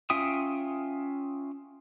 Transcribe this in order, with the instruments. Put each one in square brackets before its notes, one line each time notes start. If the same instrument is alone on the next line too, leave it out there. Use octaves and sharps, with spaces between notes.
[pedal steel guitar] C#4 F4 E5 G5 D#6